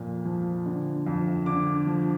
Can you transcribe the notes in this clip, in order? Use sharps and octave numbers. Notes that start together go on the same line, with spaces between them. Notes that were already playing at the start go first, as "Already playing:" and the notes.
Already playing: F2 A#2
F3
D3
F2
D3 D6
F3